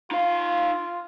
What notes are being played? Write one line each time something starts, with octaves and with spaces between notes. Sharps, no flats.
D#4 F4 F5